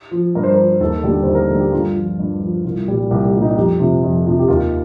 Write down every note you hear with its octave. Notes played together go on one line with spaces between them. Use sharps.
F3
G2 A#4
C5
A#4
F3
D#2 A4
D3 G3
D#2 C5
A#4
D3 A4
G3
G4
G2 F4
F3
G2
F3
C2 F4
A#2 G3
C2 G4
G4
A#2 G3
D#4
F2 G4
C3 F3
F2
C3 F3
G4
D#2 F4